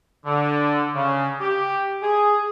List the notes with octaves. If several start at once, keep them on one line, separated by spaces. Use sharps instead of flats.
D3
C#3
G4
G#4